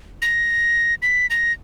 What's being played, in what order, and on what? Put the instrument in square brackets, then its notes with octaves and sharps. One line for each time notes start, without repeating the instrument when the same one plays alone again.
[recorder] A#6
B6
A#6